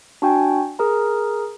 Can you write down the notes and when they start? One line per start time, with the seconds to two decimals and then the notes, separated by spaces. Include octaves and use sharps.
0.22 D4 F#4 G5 G#5
0.79 G#4 A#4 A#5